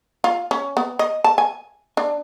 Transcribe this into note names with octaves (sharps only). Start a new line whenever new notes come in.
F4
C#4
B3
D#5
A5
G#5
D4